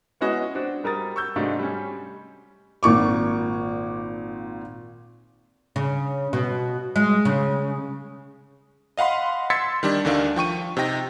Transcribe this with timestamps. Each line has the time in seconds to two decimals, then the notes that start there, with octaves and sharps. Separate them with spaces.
0.21 G#3 B3 C#4 E4 F#4 D#5
0.55 C4 D4 F#4
0.84 G3 A#4 D#6 A6
1.16 C#6 E6 G6
1.36 G#2 C3 F#3 A3 D4 D#4
1.59 G3 C#4
2.83 G#1 A#2 C#6 D6
5.76 C#3
6.33 B2
6.96 G#3
7.25 C#3
8.97 D#5 F5 F#5 B5 C6
9.50 C6 E6 G#6 A6 B6 C#7
9.83 D#3 G3 D4
10.05 D2 D3 D#3 D4 F5
10.36 F3 G5 C#6 D#7
10.77 C3 D#4 G5 A#6